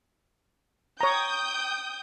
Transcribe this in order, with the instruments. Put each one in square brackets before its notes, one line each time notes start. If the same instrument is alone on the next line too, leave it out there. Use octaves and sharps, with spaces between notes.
[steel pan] C#5 A#5 [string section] G5 D#6 G6